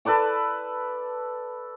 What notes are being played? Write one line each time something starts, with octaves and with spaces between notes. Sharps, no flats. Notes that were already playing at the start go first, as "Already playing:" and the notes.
A4 B4 D5 A5